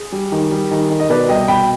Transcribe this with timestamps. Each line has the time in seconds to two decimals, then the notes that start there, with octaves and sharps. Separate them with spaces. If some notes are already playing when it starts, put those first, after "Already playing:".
Already playing: G#4
0.12 G3
0.32 D#3
0.51 G3
0.71 D#3
0.90 D#3
1.00 D#5
1.09 B2 B4 D5
1.28 C2 D#5 G5
1.48 B2 G5 B5